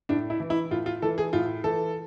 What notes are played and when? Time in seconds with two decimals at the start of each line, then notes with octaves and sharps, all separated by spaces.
0.09 A2 D4
0.30 E4
0.40 E3
0.50 E4
0.71 A2 F4
0.86 F4
1.02 E3 A4
1.18 G#4
1.33 A2 F4
1.64 E3 A4